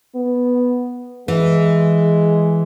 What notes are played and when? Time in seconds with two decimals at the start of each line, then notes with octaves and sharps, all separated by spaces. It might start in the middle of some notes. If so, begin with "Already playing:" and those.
0.15 B3
1.28 E3 G#3